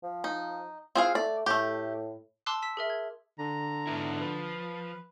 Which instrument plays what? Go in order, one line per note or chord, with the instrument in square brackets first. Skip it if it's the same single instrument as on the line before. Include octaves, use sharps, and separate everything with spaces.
[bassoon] F3
[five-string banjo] D#4
[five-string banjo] C4 G#4 F5 [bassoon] F4
[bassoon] A3 [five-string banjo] D5
[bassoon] A2 [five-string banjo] A3 G4
[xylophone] A5 C6 D6 E6 F#6 C7
E6 B6 E7
G#4 A#4 E5
G#6
[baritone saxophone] D3 [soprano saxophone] A#5
[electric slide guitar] G#2 B3 E4
[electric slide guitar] F3 [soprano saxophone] B4